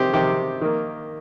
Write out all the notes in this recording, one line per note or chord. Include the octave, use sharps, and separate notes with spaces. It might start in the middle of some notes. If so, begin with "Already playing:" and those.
Already playing: C3 D#3 C4 G4 C5
C3 D#3 C4 G4
D#3 A#3